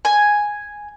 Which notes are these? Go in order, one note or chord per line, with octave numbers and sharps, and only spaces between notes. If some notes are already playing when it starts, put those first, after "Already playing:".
G#5